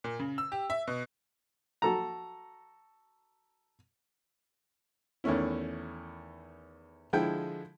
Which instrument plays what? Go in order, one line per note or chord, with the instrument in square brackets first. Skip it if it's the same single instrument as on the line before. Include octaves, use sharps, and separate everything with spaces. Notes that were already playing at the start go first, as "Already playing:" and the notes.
[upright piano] A#2
C#3
E6
G4
E5
B2
[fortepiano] F#4 A4 A#5
E2 D#3 A3 C#4 E4
D3 F3 G#3 E4 G5